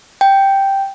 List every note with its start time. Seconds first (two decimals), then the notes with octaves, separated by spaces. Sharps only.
0.21 G5